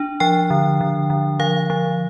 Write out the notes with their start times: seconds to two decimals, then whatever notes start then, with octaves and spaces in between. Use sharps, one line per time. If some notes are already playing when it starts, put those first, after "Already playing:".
Already playing: D4
0.20 F3 G5
0.50 D3
0.81 D3
1.10 D3
1.40 F3 F5
1.70 F3